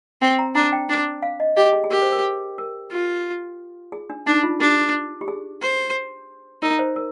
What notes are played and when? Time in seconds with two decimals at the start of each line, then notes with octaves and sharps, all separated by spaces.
0.22 C4 G5
0.39 A#5
0.55 D4 A#5
0.73 G5
0.89 D4
1.22 F5
1.40 D#5
1.57 G4 D#5
1.73 G#4
1.84 G#4
1.91 G4 A#4
2.02 C5
2.12 A#4
2.58 A#4
2.91 F4
3.92 G#4
4.10 D4
4.26 D4 D#4
4.43 F4
4.60 D4 G4
5.21 G4
5.28 G#4
5.61 C5
6.62 D#4 A#4
6.79 C5
6.96 A#4